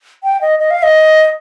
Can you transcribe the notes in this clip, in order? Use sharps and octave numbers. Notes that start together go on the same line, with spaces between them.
G5
D#5
D#5
F5
D#5